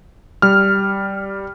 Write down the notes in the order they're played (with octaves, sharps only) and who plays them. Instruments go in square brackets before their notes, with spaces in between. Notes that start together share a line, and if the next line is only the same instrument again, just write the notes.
[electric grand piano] G3 F6